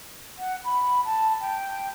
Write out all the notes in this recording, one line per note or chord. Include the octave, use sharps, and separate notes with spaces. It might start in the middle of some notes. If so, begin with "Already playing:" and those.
F#5
B5
A5
G5